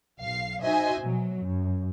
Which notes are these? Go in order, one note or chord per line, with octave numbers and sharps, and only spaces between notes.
B1 F5 C7
D#4 F#4 C5 D#5 E5 G#5
B2 F#3
F#2